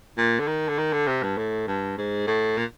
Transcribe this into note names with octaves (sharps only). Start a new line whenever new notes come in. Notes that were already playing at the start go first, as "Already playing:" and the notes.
A#2
D3
D#3
D3
D#3
D3
C3
G2
A2
G2
G#2
A2
A#2